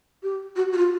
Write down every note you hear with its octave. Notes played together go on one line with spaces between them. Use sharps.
G4
F#4
F#4
F4